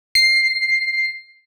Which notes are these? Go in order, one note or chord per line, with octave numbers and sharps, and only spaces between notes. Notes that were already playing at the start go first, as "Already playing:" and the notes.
C7